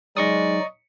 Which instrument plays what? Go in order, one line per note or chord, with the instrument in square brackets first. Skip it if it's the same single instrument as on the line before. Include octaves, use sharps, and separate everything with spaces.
[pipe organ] F#3 D#4 [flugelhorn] G#3 [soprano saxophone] D5 [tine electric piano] D#5 C#6 D#6